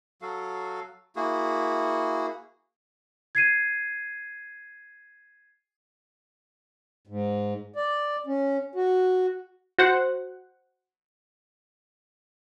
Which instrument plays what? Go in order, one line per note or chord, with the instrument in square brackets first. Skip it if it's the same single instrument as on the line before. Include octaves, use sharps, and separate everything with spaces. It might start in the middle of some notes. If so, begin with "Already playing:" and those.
[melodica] F#3 F#4 A4 F5
A#3 E4 F#4 G#4
[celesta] G#6 C7 D#7
[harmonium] G#2
D5
C#4
F#4
[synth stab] F#4 C5 F#5